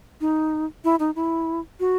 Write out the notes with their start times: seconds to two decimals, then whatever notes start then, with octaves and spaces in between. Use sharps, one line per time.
0.21 D#4
0.84 E4
1.00 D#4
1.16 E4
1.80 F#4